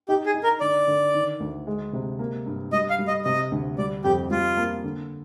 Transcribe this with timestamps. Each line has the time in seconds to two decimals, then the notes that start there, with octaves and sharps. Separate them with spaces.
0.09 D#4 G4
0.26 G#4
0.34 D#4
0.43 A#4
0.61 D3 D5
0.88 D3
1.14 D#3
1.40 D2
1.67 G#3
1.93 C3
2.19 A#3
2.46 G2
2.72 G3 D#5
2.90 F5
2.99 G3
3.07 D#5
3.25 C3 D#5
3.52 D2
3.78 G3 D5
4.04 F2 G4
4.31 G3 F4
4.57 A#3
4.84 D3